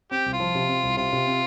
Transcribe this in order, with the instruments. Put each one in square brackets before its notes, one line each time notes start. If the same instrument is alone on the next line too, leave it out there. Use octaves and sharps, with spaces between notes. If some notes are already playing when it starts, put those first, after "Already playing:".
[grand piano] C4 [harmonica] G4
[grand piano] C2
[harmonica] F4
[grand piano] F3
C3
C4
C2
[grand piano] C3 [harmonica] F4
[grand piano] C3
C4